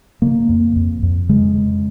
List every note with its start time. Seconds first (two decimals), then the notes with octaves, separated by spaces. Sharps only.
0.22 C#3 A#3
0.49 F2
0.76 F2
1.03 F2
1.29 C#3 G#3
1.57 C#3